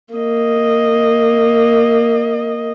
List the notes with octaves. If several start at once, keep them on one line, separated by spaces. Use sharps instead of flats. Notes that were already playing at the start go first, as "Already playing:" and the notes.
A#3 D#5